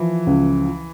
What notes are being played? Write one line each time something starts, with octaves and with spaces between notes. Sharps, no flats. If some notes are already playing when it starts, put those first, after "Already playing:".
Already playing: E3 F3
C#2